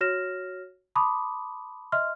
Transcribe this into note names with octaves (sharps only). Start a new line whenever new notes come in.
F#4 C#5 F6 A#6 E7
A5 B5 C6 D6 D#6
D#5 E5 C6 F6